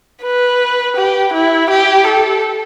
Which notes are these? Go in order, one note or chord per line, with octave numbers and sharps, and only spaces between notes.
B4
G4
E4
G4
A4